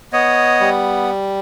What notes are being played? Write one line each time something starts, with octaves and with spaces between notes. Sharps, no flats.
B3 C#5 D#5
G3